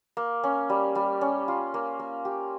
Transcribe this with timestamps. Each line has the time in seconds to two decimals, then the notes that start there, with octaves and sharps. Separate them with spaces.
0.17 A#3
0.44 C#4
0.70 G3
0.95 G3
1.21 C#4
1.48 F4
1.74 A#3
1.99 A#3
2.25 G4